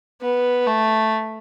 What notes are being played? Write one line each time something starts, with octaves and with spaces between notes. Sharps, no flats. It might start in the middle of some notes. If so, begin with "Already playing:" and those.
B3
A3